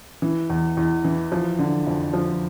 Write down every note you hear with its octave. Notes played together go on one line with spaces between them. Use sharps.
E3
E2
E2
E3
F3
D3
F2
F3